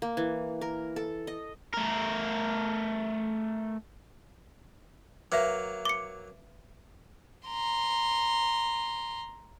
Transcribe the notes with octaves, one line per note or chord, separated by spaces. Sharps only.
A#3
E3
A#4
A4
D#5
A3 A#4
F#3 A#3 B4 E5
D6 C#7
A#5 C6